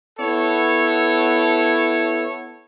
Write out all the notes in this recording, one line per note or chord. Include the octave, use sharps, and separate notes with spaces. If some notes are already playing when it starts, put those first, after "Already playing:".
B3 E4 A4 C#5